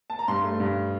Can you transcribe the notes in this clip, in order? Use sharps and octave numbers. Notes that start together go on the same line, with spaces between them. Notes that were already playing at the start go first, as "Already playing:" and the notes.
A5
A#5
G2 C6
A3
G2